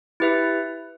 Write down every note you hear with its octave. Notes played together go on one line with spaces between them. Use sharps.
E4 G4 B4 E5